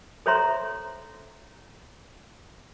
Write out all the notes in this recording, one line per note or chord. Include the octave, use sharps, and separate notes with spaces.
A4 C5 C#5 E5 A#5 C6